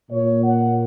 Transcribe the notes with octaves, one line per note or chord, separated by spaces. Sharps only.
A#2 C#5
F#5